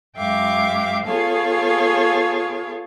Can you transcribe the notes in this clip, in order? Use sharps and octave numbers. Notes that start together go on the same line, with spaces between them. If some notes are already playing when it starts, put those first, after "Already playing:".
F#2 G#3 E5 F5 G5 D6
B3 F4 G#4 A4 C#5 F5